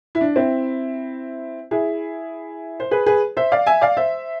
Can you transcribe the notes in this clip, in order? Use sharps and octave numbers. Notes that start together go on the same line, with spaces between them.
E4
D4
C4 E4
E4 G#4
C5
G#4 B4
G#4 B4
C5 E5
D5 F5
E5 G#5
D5 F5
C5 E5